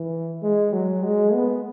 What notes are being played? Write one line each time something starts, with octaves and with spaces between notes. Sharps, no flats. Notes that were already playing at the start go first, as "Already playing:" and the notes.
Already playing: E3
G#3
F#3
G#3
B3